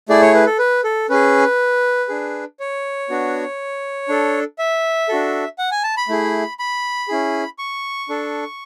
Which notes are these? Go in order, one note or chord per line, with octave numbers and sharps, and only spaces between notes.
A3 E4 G#4 D5
C#5
B4
A4
B4
A4
C#4 G#4 B4
D4 G#4
C#5
B3 D4 F#4
D4 A4
E5
D4 F#4 A4
F#5
G#5
A5
B5
A3 E4 G#4
B5
C#4 E4 G#4
C#6
D4 A4